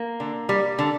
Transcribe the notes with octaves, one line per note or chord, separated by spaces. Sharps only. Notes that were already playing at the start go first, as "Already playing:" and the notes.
Already playing: A#3
D3
G3
D3